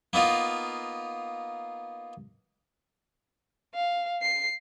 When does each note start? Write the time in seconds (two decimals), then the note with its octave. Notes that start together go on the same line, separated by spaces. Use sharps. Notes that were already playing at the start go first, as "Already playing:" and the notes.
0.13 A#3 B3 D#4 F4
3.75 F5
4.22 C7